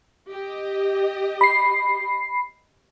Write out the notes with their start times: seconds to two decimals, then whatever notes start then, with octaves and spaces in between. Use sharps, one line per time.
0.31 G4 D#5
1.41 B5 C7